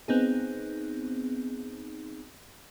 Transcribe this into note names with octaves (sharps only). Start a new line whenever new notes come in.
B3 C4 D#4 G#4